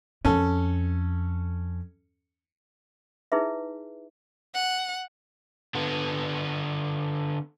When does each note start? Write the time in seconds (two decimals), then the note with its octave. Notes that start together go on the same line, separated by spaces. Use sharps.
0.25 F2 C#4 A4
3.32 D#4 E4 G#4 B4 E5
4.54 F#5
5.75 D3 B3